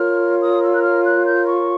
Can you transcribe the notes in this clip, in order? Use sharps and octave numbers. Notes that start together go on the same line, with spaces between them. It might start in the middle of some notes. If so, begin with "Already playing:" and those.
Already playing: F4 A#4 C#5 F6
D#6
E6
F#6
F6
F#6
G6
C#6